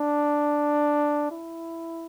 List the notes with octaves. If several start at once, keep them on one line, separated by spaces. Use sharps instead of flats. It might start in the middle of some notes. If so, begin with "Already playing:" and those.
Already playing: D4
E4